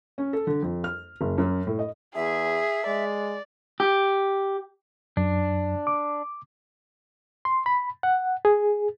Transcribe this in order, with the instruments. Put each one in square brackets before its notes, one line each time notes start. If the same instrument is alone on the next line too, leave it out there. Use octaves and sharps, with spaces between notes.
[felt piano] C#4
A4
D3
F2
F6
F#1
F#2
A2
D#5
[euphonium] E2 [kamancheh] G#4 [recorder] E5
[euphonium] G#3 [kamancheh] D5
[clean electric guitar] G4
[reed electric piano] F#2 [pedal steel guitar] D4
[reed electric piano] D6
C6
B5
F#5
G#4